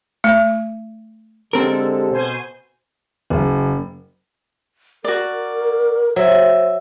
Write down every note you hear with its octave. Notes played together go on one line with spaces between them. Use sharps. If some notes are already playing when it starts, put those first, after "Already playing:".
A3
D3 G#3 C4 G4 A4 A#4
B2 C5 G#5
F#1
F#4 A#4 D5
F#3 C5 E5